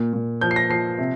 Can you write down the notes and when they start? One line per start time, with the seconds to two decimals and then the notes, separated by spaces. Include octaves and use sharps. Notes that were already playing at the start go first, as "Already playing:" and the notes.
Already playing: A#2
0.13 A#2
0.41 F3 G6
0.51 C7
0.56 A#6
0.70 F3 C7
0.98 C3